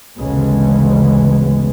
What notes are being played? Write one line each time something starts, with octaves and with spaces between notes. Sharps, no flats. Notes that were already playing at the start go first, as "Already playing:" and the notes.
G#1 D2 C#3 E3 G#3 B3